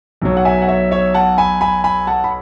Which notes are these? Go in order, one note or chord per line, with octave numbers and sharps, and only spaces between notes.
B1 B2 F#3
F#5
E5 G#5
F#5
C#5 E5
C#5 E5
F#5 A5
G#5 B5
G#5 B5
G#5 B5
F#5 A5
B5